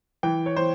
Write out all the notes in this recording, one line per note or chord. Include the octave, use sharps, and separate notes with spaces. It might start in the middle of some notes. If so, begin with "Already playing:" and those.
E3 G5
C#5
E3 C5